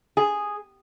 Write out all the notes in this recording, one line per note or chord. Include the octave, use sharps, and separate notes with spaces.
G#4